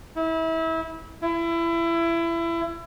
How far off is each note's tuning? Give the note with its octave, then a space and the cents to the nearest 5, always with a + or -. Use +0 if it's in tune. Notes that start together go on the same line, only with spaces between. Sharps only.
E4 -30
E4 +25